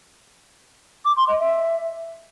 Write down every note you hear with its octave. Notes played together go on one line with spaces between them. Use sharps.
D6
C6
D#5
E5